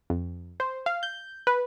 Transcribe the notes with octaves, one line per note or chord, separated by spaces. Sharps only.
F2
C5
F5
G6
B4